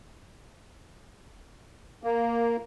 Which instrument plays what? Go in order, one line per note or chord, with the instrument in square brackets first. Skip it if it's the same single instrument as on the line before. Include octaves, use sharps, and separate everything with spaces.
[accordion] A#3